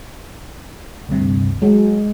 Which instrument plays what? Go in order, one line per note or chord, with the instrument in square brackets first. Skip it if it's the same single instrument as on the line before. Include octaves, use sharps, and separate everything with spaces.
[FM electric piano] D2 G2 C3
[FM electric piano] F#3 [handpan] G#3